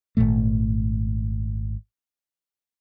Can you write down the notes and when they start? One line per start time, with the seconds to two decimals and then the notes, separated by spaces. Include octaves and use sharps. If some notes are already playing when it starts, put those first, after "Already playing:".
0.17 G#1 C#2 A#2 A3